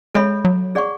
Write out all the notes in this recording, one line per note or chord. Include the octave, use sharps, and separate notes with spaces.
G#3 A4 C#5 E5 B5
F#3
G#4 D5 F#5 C#6